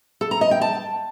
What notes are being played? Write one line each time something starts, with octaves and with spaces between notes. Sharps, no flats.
A4
A#5
D#5
G5
A5